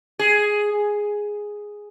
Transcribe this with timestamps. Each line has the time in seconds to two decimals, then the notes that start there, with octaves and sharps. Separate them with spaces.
0.19 G#4